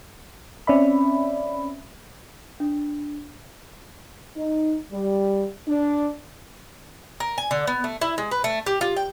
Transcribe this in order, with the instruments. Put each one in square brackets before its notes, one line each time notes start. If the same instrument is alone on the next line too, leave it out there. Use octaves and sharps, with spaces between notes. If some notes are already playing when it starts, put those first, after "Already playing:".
[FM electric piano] C4 C#4 D5 E5 B5
[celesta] D4
[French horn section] D#4
G3
D4
[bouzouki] A#4
G#5
D3
B3
A3
E4
G#3
B4
A3
G4
F4
G5